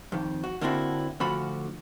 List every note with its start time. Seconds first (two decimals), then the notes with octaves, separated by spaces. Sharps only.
0.12 F2 D#3
0.44 F#4
0.61 D3 A#3 C4 D4 E4 F#4
1.20 D2 D3 F3 F4 F#4 B5